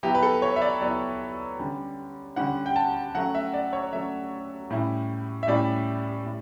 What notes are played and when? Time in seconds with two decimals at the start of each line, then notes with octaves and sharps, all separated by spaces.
0.03 F#3 B3 E4 G4
0.15 B4
0.22 A4
0.42 C#5
0.56 E5
0.62 D5
0.81 F#3 B3 E4 D5
1.59 D3 G3 C#4
2.36 D3 G3 C#4 F#5
2.66 G5
2.76 A5
3.15 F#3 A3 C#4 F#5
3.35 E5
3.54 D5
3.73 C#5
3.93 F#3 A3 C#4 E5
4.70 A2 G3 C#4 E4
5.43 E5
5.47 A2 G3 C#4 E4 D5
6.25 A2